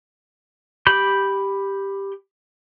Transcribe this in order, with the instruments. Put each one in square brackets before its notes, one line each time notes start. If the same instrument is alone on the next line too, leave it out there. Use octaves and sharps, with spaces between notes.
[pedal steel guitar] G4 B5 D6 G6